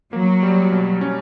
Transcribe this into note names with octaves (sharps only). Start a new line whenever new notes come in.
F#3 A#3
G3
B2
C#4